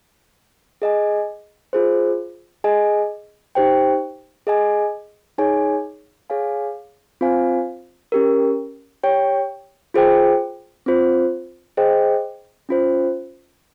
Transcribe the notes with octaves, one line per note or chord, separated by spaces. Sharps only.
G#4 D#5 G#5
F4 G#4 C5
G#4 D#5 G#5
D#4 G4 C5 G5
G#4 D#5 G#5
D#4 G#4 C#5 G#5
G#4 C#5 F5 G#5
C4 F4 C5 F5 G#5
C#4 G4 A#4
G4 C#5 G5
F4 G#4 C5 G5
C4 F4 C5
G#4 C5 D#5 G5
C#4 F4 C5